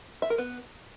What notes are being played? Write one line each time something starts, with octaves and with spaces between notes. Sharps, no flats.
E5
A#4
B3